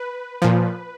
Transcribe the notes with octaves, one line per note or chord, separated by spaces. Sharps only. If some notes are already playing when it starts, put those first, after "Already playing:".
Already playing: B4
A#2 F3